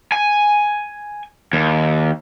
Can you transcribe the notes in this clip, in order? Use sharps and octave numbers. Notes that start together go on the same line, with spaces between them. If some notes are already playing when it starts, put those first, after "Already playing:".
G#5
D#2